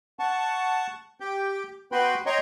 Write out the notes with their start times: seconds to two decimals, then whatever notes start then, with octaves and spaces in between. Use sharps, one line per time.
0.19 F#5 A5 C#6
1.20 G4 G5
1.92 B3 F#4 B4 G5 B5 C6
2.26 C#5 D#5 G5 A#5 C6 C#6